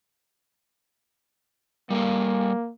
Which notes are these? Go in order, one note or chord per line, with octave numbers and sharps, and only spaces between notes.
G3 A#3 A4 F5